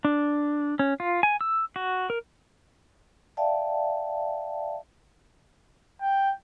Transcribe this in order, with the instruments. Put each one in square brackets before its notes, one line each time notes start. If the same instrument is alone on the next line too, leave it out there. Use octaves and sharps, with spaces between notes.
[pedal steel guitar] D4
C#4
F4
G#5
E6
F#4
A#4
[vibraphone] D5 E5 F5 G5 A5
[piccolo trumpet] G5